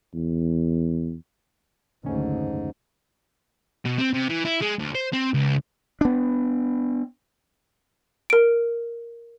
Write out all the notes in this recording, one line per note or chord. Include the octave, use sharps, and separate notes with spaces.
E2
F#1 D2 G#2 D#3 C#4
B2
C4
C3
E3
E4
G#3
D2
C5
C4
C#2
B3 D4
A#4 D7